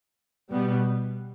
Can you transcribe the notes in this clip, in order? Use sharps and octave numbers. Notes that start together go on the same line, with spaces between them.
B2 G3 B3